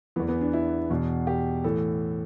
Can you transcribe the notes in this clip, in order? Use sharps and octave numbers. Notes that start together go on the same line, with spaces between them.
E2 E3 B3
B3
D4
E4
E2 B2
G4
A2 E3 A4